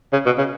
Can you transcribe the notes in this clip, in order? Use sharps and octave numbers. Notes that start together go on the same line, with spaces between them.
C#3
B2
C#3